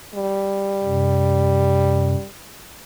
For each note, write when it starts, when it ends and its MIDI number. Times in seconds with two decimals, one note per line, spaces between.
0.15 2.27 55
0.84 2.15 42
0.84 2.15 48